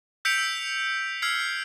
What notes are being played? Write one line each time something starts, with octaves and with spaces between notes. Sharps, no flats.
E6 G6 B6 C#7 D7 F7
E6
E6 F6 G#6 C7